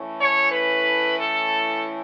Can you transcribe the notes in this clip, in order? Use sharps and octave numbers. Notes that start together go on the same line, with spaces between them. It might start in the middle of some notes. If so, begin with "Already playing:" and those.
Already playing: A2 E3 A3 C#4
C#5
B4
A4